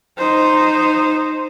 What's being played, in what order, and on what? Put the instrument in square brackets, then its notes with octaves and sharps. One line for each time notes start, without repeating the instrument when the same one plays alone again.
[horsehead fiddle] D#4 C5